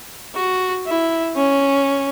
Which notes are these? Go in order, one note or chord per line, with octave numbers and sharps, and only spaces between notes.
F#4
E4
C#4